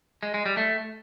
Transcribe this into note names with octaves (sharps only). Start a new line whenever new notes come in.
G#3
G#3
G3
A3